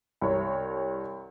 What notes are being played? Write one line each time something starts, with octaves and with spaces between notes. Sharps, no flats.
C2 C#5